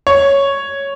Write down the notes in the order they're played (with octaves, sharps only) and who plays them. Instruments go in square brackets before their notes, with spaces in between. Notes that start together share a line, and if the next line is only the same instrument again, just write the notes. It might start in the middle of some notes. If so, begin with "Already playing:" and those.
[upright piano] C#5